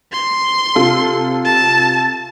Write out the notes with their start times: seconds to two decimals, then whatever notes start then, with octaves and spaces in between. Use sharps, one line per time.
0.12 C6
0.75 C3 F4 A4
1.45 A5